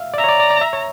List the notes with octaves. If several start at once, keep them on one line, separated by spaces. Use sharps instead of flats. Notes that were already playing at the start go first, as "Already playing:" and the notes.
Already playing: E5 F5
D5
E5 A#5
C#5
D5
D5
D5
E5
C#5